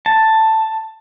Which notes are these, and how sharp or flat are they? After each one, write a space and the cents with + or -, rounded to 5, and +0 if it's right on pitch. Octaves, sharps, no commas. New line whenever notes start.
A5 +5